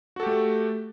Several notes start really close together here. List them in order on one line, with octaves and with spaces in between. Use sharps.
F#4 A4 G4 A3